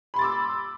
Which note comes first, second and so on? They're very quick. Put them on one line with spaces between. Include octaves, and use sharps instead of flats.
B5 C6 A6 D6 E6